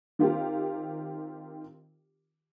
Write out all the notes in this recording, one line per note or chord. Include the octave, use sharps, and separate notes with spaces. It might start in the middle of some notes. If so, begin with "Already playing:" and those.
D#3 C4 F4 G4 A#4